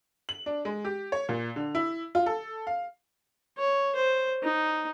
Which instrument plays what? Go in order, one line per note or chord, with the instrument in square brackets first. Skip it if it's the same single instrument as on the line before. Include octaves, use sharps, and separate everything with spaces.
[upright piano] F#7
D4
G#3
G4
C#5
A#2
D3
E4
F4
A4
F5
[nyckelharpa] C#5
C5
D#4